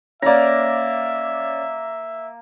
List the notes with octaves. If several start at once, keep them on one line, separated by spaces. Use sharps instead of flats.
A#3 C#4 D5 E5 A#5